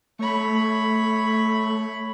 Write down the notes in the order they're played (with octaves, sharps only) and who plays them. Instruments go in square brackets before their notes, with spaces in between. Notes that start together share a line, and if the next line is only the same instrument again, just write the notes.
[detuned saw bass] A3 [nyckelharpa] C#5 B5